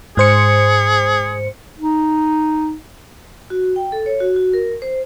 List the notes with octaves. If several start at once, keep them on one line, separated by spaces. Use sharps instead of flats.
G#2 G#4 C5 C#7
D#4
F#4
G5
A4
C#5
F#4
F#4
A#4
C5